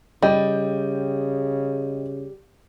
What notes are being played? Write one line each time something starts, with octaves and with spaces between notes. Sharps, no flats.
C#3 G3 D#5 G5